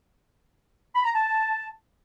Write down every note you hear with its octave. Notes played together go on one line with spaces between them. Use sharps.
B5
A#5
A5